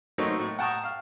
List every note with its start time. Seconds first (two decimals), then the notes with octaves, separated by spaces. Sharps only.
0.18 F#3 A3 A#3 C4 D#4 C#5
0.37 A2 C#6
0.59 F#5 G5 A5 A#5 C#6 D#6
0.84 F5 F6